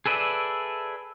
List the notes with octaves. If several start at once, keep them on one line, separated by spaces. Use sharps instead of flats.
G#4 A4 B4 D5 E5